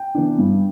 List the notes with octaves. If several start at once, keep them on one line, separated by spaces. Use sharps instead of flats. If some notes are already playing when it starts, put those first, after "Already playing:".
Already playing: G5
E3 B3 D4
G2